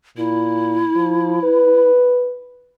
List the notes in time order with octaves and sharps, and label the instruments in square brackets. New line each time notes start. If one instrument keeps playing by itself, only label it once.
[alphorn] A#2 [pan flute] E4
[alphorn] F3
B4